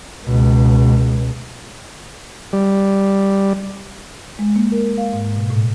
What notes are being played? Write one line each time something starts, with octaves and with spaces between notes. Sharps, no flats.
C#2 B2
G3
G#3
A#3
A#4
F5
G#2
B2
A2